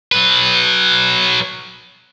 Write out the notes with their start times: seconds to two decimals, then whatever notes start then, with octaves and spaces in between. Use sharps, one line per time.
0.12 F#3 B4